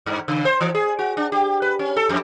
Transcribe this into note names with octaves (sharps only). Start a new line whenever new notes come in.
G2
C#3
C5
E3
G#4
F#4
D4
G4
B4
C#4
A4
F2